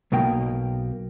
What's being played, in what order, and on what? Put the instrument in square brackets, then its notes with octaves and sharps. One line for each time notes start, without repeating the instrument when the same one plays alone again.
[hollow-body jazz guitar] B1 B2 A#3 G5